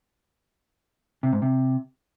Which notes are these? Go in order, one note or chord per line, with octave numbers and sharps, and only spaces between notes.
C3
G#2
C3